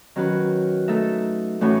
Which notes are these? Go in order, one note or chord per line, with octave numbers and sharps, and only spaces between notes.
D#3 F#3 C#4 F#4 B4
A3 D#4 A4 E5
A2 E3 A3 C#4 F#4